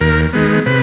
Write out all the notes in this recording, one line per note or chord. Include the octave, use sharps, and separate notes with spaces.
D#2 A#4
D#3 G#3 B3
C3 B4